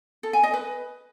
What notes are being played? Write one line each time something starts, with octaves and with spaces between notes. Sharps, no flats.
A4
G#5
D#5
B4